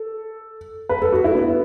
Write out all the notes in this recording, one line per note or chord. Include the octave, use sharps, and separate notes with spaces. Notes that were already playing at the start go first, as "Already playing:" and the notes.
Already playing: A4
B4
A4
F#4
E4
B3